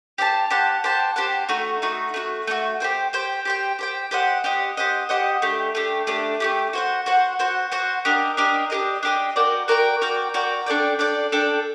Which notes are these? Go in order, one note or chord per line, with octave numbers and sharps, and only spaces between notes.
G4 C5 F#5 A5
G4 C5 F#5 A5
G4 C5 F#5 A5
G4 C5 F#5 A5
A3 D#4 F#4
A3 D#4 F#4
A3 D#4 F#4
A3 D#4 F#4
G4 C5 G5
G4 C5 G5
G4 C5 G5
G4 C5 G5
G4 C5 D#5 F#5
G4 C5 D#5 F#5
G4 C5 D#5 F#5
G4 C5 D#5 F#5
A3 D4 G4
A3 D4 G4
A3 D4 G4
A3 D4 G4
F#4 C5 F#5
F#4 C5 F#5
F#4 C5 F#5
F#4 C5 F#5
D4 G4 A#4 D#5
D4 G4 A#4 D#5
D4 G4 A#4 D#5
D4 G4 A#4 D#5
F#4 A#4 D5 G5
F#4 A#4 D5 G5
F#4 A#4 D5 G5
F#4 A#4 D5 G5
D4 A4 D5 G5
D4 A4 D5 G5
D4 A4 D5 G5